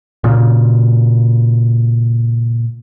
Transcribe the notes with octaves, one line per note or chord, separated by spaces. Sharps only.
A#2 C#3